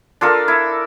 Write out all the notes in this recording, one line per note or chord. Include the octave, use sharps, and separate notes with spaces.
D4 F4 A4 A#4
E4